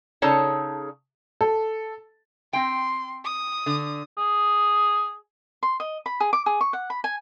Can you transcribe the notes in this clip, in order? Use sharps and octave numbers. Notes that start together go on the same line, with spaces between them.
C#3 D#4 G#4 A4 C#5 A5
A4
C4 G5 C6
D#6
D3
G#4
C6
D#5
B5
G#4
D6
G#4
C#6
F#5
B5
G#5